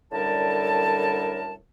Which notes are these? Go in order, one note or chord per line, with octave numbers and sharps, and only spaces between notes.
F#2 A2 D3 G3 A#4 A5